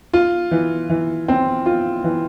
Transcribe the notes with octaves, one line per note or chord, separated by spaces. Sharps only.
F4
E3
E3
C4
F4
E3